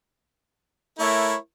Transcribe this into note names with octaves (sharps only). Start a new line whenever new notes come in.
A3 E4 A#4 C#5